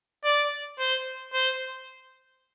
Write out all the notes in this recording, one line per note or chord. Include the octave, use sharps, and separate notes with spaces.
D5
C5
C5